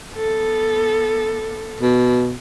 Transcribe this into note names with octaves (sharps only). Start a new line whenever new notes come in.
B3 A4
B2